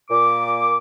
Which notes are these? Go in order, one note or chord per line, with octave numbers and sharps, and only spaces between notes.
A#2 D6